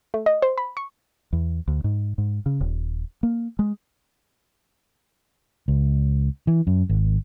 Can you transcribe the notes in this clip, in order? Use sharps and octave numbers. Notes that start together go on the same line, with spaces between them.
A3
D#5
C5
B5
C#6
E2
D2
G#2
G#2
C#3
D#1
A#3
G#3
C#2
E3
F#2
G#1